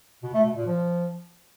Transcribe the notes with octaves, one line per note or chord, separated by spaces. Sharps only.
B2
A3
B2
A#2
F3